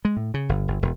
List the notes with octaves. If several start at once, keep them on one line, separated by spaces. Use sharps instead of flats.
G#3
A2
C#3
G1
G1
E1